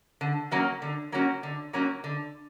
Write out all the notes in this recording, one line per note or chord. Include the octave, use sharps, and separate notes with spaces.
D3
F#3 A#3 C#4 F#4
D3
F#3 A#3 C#4 F#4
D3
F#3 A#3 C#4 F#4
D3